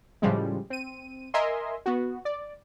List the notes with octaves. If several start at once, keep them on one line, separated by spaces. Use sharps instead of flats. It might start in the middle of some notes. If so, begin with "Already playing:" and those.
A2 C#3 F3 G3 G#3
C4 D#7
A#4 D#5 E5 G#5 C6
B3 F#4
D5